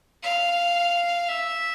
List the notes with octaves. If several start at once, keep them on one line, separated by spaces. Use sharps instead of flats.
F5
E5